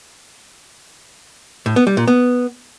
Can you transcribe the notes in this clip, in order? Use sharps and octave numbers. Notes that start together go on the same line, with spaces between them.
A2
B3
G3
A#2
B3